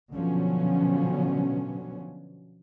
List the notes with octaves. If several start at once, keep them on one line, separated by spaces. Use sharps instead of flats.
B2 D3 F3 F#3 B3 C#4